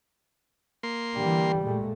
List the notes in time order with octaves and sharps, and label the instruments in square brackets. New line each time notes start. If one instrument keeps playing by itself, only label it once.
[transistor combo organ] A#3 C6
[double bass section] D3 E3 [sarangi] G3
[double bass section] A#2 G#3 A3